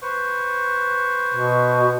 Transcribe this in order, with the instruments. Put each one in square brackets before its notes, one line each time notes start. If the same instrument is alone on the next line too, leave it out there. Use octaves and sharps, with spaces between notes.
[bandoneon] B4 C5 C#6
[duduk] B2